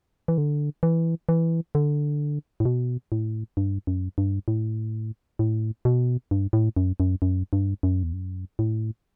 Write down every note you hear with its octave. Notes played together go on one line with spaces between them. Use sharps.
E3
D3
E3
E3
D3
A2
B2
A2
G2
F#2
G2
A2
A2
B2
G2
A2
F#2
F#2
F#2
G2
F#2
E2
F#2
A2